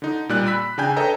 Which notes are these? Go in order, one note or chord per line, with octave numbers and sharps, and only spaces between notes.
D3 D#4
A#2 G3 D5 F#6
B5 E6 F#6 B6
C#3 D4 G5 G#5 G6
A4 B4 C#5 D#5 G5 A#5